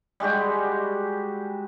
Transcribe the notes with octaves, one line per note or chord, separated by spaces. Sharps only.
G3 G#3 F#4 G4